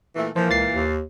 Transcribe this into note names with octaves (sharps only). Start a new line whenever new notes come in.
A#2 E3 A3
A#2 E3 F3 A#3 C5
C#2 A6 C7
D#2